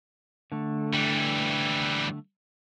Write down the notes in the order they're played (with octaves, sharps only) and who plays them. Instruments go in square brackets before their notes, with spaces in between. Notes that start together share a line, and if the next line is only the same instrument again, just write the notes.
[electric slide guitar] D3 A3
[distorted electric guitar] E3 G3